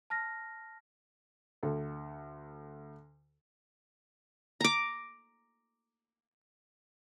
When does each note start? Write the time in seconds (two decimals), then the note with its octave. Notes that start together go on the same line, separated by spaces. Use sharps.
0.10 A5 F6 A#6
1.63 D2 A4
4.61 A#5 D6